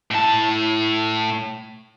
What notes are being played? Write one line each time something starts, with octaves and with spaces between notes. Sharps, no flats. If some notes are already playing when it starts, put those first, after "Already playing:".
A2 A5